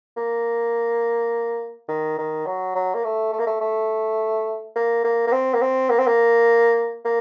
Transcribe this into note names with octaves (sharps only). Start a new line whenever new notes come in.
A#3
D#3
D#3
F#3
F#3
A#3
A3
A3
A#3
A3
A3
A#3
A#3
A#3
C4
A#3
C4
A#3
C4
A#3
A#3